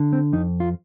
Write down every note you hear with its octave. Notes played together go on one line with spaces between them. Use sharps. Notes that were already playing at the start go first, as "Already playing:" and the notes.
Already playing: D3
C4
F2 D#4
F4